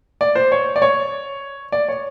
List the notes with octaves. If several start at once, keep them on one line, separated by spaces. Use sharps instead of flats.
D5
C5
C#5
D5
C#5
D5
C#5